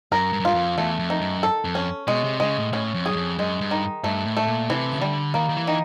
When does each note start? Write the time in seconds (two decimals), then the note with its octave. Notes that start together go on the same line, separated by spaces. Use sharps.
0.12 F#2 A#4
0.33 G2
0.40 F#2
0.45 G2 F4
0.55 F2
0.78 E2 A3
0.99 F2
1.10 D#3
1.21 F#2
1.43 A4
1.65 F2
1.75 C#4
2.07 B2 G#3
2.24 C3
2.40 C#3 G#3
2.57 A2
2.73 A2 C#4
2.94 F2
3.06 G#4
3.11 F#2
3.16 F2
3.38 F#2 G#3
3.61 G2
3.71 D#3
4.04 G2 A3
4.25 A2
4.37 A3
4.47 A#2
4.69 C3 E3
4.92 C#3
5.01 D3 G3
5.34 D#3 A#3
5.49 D#3
5.56 E3
5.67 D#3